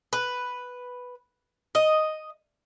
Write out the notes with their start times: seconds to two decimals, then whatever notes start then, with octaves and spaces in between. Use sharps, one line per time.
0.13 B4
1.75 D#5